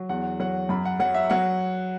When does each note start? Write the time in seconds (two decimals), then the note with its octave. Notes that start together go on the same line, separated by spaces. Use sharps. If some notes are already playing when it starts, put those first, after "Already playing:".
Already playing: F#3
0.09 E2 F#5
0.40 F#3 F#5
0.69 F#2 B5
0.85 F#5
1.00 F#3 F#5
1.15 E5
1.30 F#3 F#5